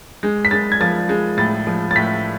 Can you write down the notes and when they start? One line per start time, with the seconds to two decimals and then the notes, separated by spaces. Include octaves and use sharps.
0.23 G#3
0.45 B6
0.51 G#3 A6
0.72 G#6
0.81 F3 A6
1.09 G#3
1.37 A2 A6
1.67 F3
1.91 A6
1.95 A2 B6